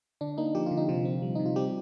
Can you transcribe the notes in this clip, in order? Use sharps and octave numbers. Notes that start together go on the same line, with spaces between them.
D3 D4
A#3 D#4
F3 G4
D3 F4
D#4
C3 F3 F4
C4
G3
C3 D#4
F4
G3 C4 G4